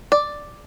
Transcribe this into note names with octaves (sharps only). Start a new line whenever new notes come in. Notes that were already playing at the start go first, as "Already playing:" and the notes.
D5